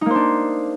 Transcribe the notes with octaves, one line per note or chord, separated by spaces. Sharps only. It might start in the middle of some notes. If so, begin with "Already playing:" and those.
A#3 D4 D#4 C5